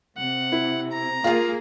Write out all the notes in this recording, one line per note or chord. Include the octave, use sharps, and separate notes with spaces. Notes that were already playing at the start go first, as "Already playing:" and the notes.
C3 F#5
E4
A#5
A#3 F4 G#4 F5